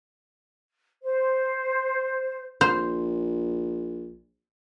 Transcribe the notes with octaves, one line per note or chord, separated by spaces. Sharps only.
C5
A#1 C5